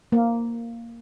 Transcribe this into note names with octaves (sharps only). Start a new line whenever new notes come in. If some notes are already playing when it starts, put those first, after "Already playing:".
A#3